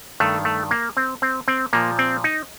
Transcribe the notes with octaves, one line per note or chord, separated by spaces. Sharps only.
G2 D#3 A3
A3
A#3
C4
C4
C4
A#2 F3 A#3
C4
D#4